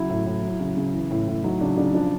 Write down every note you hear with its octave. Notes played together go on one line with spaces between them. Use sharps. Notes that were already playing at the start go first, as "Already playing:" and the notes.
Already playing: C#3 F#3 E4
A2
A2
F#3
C#3
C#3
E3
A2
A2
F#3 D#4
C#3 D4
C#3 D4
F3 D4